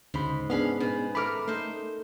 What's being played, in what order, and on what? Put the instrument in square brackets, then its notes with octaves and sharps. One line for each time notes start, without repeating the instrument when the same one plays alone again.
[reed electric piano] D2 C#3 B5 [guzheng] G#2
[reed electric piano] B3 D4 G#4 [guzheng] C#4 F5 B5
[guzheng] B2
[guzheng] A3 A#4 [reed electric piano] B5 D6 F6
[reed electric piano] A3 [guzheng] D#4 C5